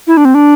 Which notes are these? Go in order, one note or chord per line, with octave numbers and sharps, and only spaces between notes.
E4
D4
C4
D4